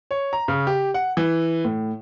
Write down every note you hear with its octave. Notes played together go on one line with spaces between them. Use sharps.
C#5
A#5
C#3
G4
F#5
E3
A2